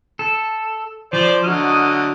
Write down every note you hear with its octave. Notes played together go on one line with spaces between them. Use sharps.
A4
F3 C5 D5
D3 F#3 D#5 F6